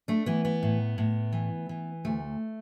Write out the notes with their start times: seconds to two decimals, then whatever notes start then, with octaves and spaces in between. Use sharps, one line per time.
0.08 A3 D4
0.26 E3 B3
0.45 B3
0.63 A2
0.98 A2
1.33 E3
1.69 E3
2.05 D2 A3